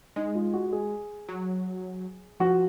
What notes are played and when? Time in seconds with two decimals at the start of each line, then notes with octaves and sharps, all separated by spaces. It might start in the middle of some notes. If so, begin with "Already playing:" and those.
0.16 G#3 D#4
0.35 F4
0.53 F#4
0.72 G#4
1.28 F#3
2.40 F3 F#4